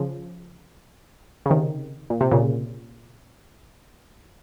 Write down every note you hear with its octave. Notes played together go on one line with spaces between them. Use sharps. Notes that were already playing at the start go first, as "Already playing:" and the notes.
Already playing: C#3 F3
C#3
C3 D#3
A#2
C3
A#2 C#3